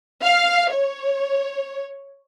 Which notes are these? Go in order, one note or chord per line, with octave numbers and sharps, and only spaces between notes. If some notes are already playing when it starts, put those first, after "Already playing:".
F5
C#5